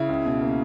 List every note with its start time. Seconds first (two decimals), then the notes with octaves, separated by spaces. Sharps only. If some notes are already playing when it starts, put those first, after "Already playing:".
Already playing: C#3 E4
0.09 C#2
0.26 B2
0.41 A#3